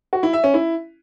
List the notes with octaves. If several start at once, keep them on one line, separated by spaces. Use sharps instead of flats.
F#4
E4
E5
C#4
E4